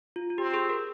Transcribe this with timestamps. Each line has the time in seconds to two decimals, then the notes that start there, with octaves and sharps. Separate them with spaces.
0.16 F4
0.30 F4
0.38 C4 G4
0.54 G#4
0.70 A#4